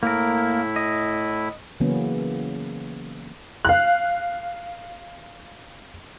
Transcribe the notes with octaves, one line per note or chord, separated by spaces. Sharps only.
A2 A#3 E4 A#4
D#5
C#3 E3 F#3 A#3 B3 C#4
F5 F#6